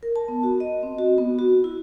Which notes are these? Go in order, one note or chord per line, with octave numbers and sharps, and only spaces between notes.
A#4
A5
B3
F#4
D#5
C4
F#4
B3
F#4
E4